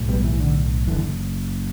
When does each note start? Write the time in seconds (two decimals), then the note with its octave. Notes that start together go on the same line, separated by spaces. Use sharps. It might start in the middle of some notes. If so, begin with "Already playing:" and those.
Already playing: B1 A2
0.09 G3 B3
0.24 E3
0.40 D3
0.87 F#1 E3
0.90 D3